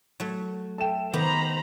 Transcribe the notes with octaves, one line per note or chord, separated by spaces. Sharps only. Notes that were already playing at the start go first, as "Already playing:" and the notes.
F#3 A3
A4 E5 G5 A5 E7
D#3 B3 G4 C5 A#5 B5